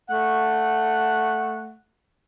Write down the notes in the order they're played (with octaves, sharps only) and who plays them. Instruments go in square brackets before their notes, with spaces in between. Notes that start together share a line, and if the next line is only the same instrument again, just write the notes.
[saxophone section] A3 F#5